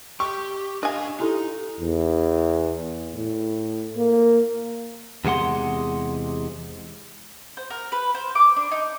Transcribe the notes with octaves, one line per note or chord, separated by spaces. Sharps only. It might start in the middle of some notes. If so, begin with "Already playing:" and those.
G4 C#6
D4 D#5 F5 G#5
D#4 E4 G4 A4
E2
A2
A#3
E2 C3 G#3 F#5 C6
C5
A#4
B4
C5
D6
D4
D#4